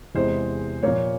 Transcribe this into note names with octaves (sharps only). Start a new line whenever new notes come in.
E2 C3 E3 G#3 C5
A#2 F3 A#3 C#5